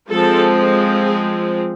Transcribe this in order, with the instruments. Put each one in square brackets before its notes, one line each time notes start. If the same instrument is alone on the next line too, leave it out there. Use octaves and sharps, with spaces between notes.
[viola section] F3 G#3 C4 A4
G#4